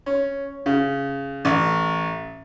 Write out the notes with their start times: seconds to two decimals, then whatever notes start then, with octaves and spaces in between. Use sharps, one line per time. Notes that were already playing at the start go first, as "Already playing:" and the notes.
0.06 C#4
0.66 C#3
1.45 A1